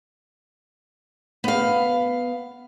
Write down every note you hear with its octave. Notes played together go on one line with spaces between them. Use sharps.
B3 F5